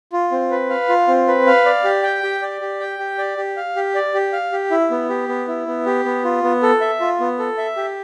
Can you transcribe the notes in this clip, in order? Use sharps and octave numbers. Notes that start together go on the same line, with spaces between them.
F4
C4
B4
F5
F4
C4
B4
F5
D5
G4
G5
G4
D5
G4
G5
G4
D5
G4
F5
G4
D5
G4
F5
G4
E4
B3
G4
B3
E4
B3
G4
B3
F4
B3
A4
E5
F4
B3
A4
E5
G4